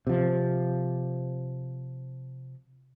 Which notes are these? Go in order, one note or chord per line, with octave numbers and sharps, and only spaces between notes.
C3 F3